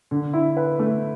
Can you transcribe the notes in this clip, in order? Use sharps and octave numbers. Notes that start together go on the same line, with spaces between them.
D3
E4
B4
A3